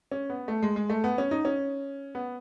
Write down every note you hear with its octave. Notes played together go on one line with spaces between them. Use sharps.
C#4
B3
A3
G#3
G#3
A3
B3
C#4
D#4
C#4
B3